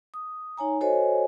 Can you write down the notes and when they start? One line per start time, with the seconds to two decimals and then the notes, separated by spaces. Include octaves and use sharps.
0.14 D#6
0.57 D#4 C#5 G#5 A#5
0.81 F#4 A4 C5 C#5 D#5 G#5